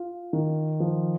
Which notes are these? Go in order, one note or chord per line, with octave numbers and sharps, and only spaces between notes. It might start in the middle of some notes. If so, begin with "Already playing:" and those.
Already playing: F4
D#3
F3